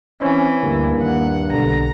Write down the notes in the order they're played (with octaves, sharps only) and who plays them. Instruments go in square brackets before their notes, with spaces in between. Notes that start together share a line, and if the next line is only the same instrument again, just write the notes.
[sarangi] E3 [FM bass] C4 [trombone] C#4
[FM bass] D2 [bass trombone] G2 [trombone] A#3
[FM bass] D#2 [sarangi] F#5
[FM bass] B1 [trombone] D3 [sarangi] A#5